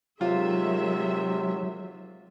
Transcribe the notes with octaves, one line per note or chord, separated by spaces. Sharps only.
C3 D#3 F#3 G#3 F4 E5